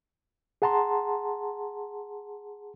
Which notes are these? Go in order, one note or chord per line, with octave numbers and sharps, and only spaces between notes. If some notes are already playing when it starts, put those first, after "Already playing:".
G#4 F#5 A5 A#5 C6